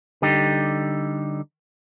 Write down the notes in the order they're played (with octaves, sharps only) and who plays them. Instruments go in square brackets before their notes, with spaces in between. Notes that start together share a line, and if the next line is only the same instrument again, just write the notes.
[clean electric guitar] D3 G3 D#4 G4